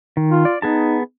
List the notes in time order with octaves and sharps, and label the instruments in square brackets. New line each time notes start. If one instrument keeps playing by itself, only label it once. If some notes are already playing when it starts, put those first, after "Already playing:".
[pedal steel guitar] D#3
[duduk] F4
[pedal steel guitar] D5
[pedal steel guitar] B3 G#4 A5 [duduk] D#4